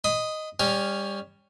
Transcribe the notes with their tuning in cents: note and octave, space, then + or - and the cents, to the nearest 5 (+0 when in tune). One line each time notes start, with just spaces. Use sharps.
D#5 +0 B5 +35
G3 +25 C#4 +5